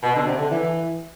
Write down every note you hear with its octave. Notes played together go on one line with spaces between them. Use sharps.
B2
D3
C3
D3
E3